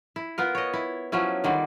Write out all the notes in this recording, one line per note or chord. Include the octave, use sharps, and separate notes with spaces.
E4
B3 F4 A#4
C#5 D#5
E4
F3 F#3 C#4 E4
D3 D#3 G3 D5